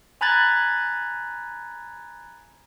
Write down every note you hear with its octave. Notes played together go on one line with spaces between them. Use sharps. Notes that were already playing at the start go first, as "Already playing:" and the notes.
G#5 A#5 B5 F#6 G#6 A6